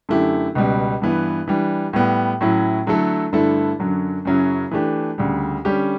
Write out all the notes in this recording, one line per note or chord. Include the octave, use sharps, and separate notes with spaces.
F#2 D3 A3 E4 G4
C#2 B2 G3
G2 E3 B3
E3 G3 D4
A2 G3 B3
A2 F#3 C#4 E4
D3 F#3 A3 E4 A4
G2 D3 A3 E4 A4
F#2 D3 F#3
F#2 C#3 F#3 C#4 E4
E3 A3 D4 G4
D2 C#3 G3
D3 G3 C#4 G4